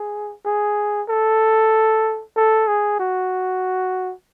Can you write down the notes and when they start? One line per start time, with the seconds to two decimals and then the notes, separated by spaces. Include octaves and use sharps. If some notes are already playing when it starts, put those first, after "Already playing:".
Already playing: G#4
0.46 G#4
1.09 A4
2.36 A4
2.67 G#4
3.00 F#4